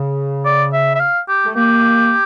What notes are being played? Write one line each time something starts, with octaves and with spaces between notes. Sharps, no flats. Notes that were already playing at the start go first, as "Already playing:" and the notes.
Already playing: C#3
D5
E5
E5
F5
G4
A3
A#3 G4